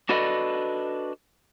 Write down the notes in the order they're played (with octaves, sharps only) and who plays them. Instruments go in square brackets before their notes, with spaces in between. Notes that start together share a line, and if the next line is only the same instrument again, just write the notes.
[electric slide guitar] D4 F#4 A4 B4 D5 D#5